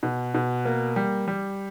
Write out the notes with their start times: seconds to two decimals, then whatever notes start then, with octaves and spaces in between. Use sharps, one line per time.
0.03 B2
0.34 B2
0.65 A#3
0.96 G3
1.28 G3